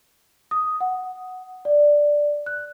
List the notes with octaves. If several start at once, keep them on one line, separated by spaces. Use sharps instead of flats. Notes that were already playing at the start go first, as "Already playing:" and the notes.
D#6
F#5
D5
F#6